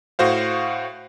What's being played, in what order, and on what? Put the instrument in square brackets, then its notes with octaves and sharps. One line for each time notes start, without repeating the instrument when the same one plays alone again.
[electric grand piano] A2 F#4 C5 F5